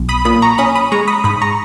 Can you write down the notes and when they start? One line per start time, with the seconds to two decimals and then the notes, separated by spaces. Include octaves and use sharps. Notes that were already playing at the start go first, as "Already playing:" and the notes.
Already playing: B1
0.09 B5 D#6
0.25 A#2 B5 D#6
0.42 A#5 C#6
0.58 C#4 B5 D#6
0.75 B5 D#6
0.92 G#3 A#5 C#6
1.08 B5 D#6
1.24 G#2 B5 D#6
1.42 A#5 C#6